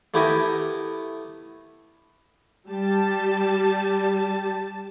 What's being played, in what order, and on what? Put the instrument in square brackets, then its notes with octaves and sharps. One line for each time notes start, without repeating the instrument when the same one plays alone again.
[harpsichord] A3 B3 E4 G4 A#4 G#5
[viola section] G3 G4 A5